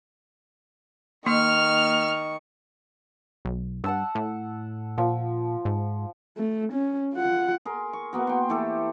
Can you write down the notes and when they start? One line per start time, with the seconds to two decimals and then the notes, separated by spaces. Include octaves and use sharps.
1.26 D#3 A#3 C#6 F6
3.45 B1
3.84 G2 F#5 A5 E6
4.15 A2
4.98 A#2 F3
5.65 G#2
6.37 A3
6.72 C#4
7.15 F4 F#5
7.65 G#4 A#4 C6
7.93 C#6
8.13 A#3 B3 F#4
8.27 G5 C6
8.49 E3 A3 G4 A4